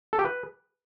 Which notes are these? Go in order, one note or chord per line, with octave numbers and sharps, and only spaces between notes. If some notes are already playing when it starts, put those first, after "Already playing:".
A4
G4
B4